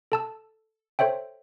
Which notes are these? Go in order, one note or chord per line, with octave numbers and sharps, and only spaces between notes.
A4 A5 E6
A4 C5 C#5 E5 G5